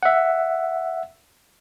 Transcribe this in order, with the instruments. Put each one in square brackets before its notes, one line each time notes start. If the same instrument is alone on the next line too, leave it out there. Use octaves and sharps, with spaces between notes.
[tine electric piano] E5 F#5